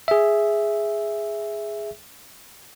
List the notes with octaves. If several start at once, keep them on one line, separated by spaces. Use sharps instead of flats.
G#4 E5